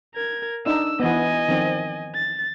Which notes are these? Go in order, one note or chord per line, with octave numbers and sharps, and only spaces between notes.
A#4 G#6
D4 D#4 E6
E3 B3 D#5 G#5
D#3 F3 C4
A6